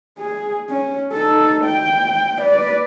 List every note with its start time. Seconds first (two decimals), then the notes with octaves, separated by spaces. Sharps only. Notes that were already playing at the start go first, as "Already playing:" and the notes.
0.19 G#4
0.69 C#4
1.12 D#4 A4
1.64 G5
2.41 B4 D5